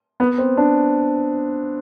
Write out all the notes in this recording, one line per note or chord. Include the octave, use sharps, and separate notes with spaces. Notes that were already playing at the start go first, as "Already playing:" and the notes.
B3
C4
D4